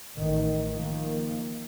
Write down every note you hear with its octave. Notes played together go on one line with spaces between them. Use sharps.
A1 D#3
D#3 F3 A#3